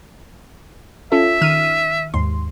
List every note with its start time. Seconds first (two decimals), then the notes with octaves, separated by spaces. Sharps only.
1.12 C#4 F4 A4 E5
1.41 D#3 F6 D#7
2.14 D#2 G#2 C6